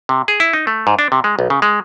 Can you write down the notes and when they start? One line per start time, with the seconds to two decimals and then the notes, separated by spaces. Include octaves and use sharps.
0.09 C3
0.28 G#4
0.40 E4
0.53 D#4
0.67 A3
0.87 G#2
0.99 D4
1.12 C3
1.24 G#3
1.39 B1
1.50 C#3
1.62 G#3